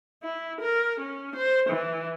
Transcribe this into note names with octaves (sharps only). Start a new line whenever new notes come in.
E4
A#4
C#4
C5
E3